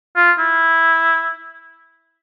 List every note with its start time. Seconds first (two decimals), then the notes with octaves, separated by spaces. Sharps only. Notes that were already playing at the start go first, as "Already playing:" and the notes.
0.16 F4
0.39 E4